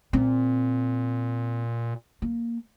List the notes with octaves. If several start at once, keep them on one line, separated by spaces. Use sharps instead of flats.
A#2 C4
A#3